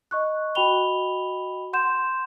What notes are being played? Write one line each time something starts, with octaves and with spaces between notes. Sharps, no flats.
D#5 C#6 F#6
F#4 D#5 G5 B5 F7 G7
F#5 C6 G6 E7